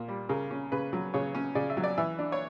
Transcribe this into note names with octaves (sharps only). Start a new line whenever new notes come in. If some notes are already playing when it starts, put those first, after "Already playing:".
Already playing: A#2 A#3
G3
C#3 A#4
C#4
C#3 B4
F#3
C#3 C#5
C#4
C#3 D5
E5
F#3
D5
E3 E5
D4
C#5